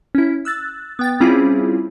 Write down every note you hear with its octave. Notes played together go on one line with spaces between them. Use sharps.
C#4 E4
E6 F#6 A6
B3 G5 A6
G3 C4 C#4 E4 F4 G#4